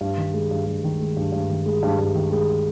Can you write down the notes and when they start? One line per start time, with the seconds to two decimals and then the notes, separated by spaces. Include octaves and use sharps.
0.01 G2
0.17 D#3
0.34 G#3
0.51 G2
0.67 G2
0.84 D#3
1.00 G#3
1.17 G2
1.32 G2
1.50 D#3
1.66 G#3
1.83 G2
1.99 G2
2.15 D#3
2.31 G#3